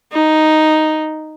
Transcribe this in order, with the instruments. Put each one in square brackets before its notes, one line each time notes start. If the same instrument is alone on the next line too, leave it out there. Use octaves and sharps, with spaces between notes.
[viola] D#4